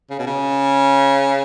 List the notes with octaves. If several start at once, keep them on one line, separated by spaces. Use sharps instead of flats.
C#3
B2
C#3